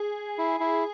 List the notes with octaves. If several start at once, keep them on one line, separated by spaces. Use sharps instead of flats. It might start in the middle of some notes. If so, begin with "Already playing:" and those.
Already playing: G#4
E4
E4